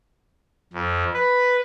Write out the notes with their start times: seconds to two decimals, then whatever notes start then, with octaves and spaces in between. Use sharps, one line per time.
0.73 F2
1.13 B4